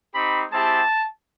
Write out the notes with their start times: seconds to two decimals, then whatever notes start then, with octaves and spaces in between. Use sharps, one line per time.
0.14 C4 D#4 G4 B5
0.52 G#3 C4 E4 G4 A5